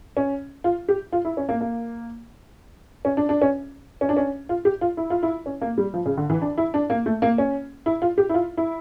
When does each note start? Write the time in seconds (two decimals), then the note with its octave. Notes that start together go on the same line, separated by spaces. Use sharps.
0.17 C#4
0.64 F4
0.88 G4
1.13 F4
1.25 E4
1.37 C#4
1.49 A#3
1.61 A#3
3.05 C#4
3.17 D4
3.29 D4
3.42 C#4
4.01 C#4
4.09 D4
4.17 C#4
4.49 F4
4.65 G4
4.81 F4
4.97 E4
5.10 F4
5.23 E4
5.46 C#4
5.62 A#3
5.78 G3
5.94 F3
6.06 C#3
6.17 D3
6.30 E3
6.42 D4
6.58 E4
6.74 D4
6.90 A#3
7.06 A3
7.22 A#3
7.38 C#4
7.86 E4
8.02 F4
8.18 G4
8.29 E4
8.34 F4
8.57 E4